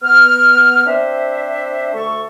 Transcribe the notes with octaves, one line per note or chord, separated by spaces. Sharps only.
B3 F6
C4 D4 C5 E5
D2 A3 A4 C#6